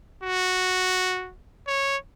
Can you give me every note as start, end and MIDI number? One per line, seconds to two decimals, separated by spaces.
0.24 1.31 66
1.68 1.97 73